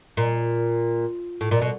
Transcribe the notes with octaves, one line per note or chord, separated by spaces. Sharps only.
A#2
A2
A#2
B2